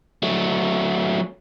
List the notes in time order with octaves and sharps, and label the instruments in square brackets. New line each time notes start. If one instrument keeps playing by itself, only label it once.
[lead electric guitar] F#3 A3